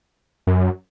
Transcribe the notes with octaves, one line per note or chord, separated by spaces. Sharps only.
F#2